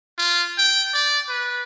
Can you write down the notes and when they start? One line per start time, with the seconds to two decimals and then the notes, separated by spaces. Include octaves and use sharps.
0.18 F4
0.58 G5
0.94 D5
1.29 B4